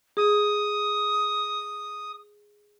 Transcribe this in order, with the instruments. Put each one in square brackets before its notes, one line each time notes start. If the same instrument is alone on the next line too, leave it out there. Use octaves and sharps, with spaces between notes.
[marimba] G#4 [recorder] D#6